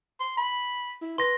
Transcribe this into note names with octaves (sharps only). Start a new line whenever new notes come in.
C6
B5
E4
B4 C6 A#6